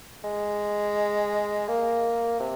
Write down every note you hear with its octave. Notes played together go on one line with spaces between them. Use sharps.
G#3
A#3
C3